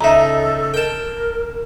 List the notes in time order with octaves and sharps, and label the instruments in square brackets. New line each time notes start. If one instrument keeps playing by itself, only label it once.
[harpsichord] C#2 D#4 [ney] A4 [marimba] E5 A#5
[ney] A#4 [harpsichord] G5 A5